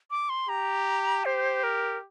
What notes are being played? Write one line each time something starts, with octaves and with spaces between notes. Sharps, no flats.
D6
C6
G4 A#5
G4 C5
A#4